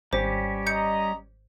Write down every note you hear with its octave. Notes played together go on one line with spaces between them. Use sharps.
G#1 G3 C#4 G4 C5
D#5 A#5 G6 C#7